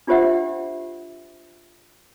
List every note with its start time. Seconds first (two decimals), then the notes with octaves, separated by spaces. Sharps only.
0.07 D4 F4 G4 C5 E5 F#5